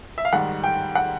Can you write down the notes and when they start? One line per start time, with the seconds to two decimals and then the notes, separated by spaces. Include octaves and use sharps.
0.18 E5
0.25 F5
0.33 G#2 D#3 G3 F#5
0.64 G5
0.95 F#5